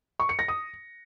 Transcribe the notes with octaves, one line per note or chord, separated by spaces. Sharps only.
C#6
C#7
A#6
D#6